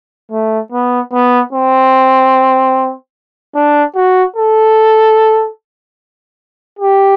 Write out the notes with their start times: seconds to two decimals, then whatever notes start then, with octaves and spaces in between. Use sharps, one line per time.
0.31 A3
0.72 B3
1.13 B3
1.53 C4
3.55 D4
3.96 F#4
4.36 A4
6.79 G4